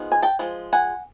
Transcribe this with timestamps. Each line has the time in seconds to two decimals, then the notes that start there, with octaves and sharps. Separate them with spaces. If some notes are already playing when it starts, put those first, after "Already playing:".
Already playing: F3 G#3 B3 D#4
0.12 G#5
0.22 G5 A5
0.39 F3 G#3
0.73 F#5 G#5